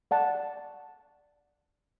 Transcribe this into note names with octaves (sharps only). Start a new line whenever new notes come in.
D5 F#5 A5